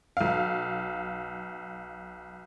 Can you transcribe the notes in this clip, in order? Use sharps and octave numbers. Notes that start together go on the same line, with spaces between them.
B1 F5